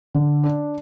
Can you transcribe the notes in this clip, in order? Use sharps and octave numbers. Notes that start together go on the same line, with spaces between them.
D3
D4